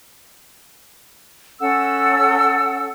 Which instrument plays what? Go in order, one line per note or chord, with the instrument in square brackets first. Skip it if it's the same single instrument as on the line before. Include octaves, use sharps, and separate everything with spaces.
[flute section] C#4 A4 F#5 E6